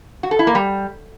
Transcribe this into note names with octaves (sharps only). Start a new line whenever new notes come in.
F#4
A4
E4
A#3
G3